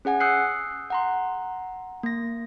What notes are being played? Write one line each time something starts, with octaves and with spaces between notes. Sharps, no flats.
C#4 G#4 F#5 G#5
D#6 E6 F#6 G6 C7 C#7
F#5 A#5 C6
A#3 A#6